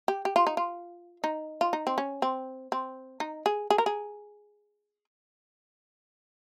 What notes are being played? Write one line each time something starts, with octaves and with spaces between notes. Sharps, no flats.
G4
G4
F4
D#4
F4
D#4
F4
D#4
C4
C#4
C4
C4
D#4
G#4
G#4
A#4
G#4